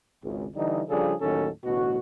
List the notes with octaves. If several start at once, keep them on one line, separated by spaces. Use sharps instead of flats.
G#1 C#2
D3 E3 G3 D#4
C#3 F3 G3 D4 G#4 A4
D#2 A2 D#3 F#3 C#4 A4
A1 D2 B2 F#4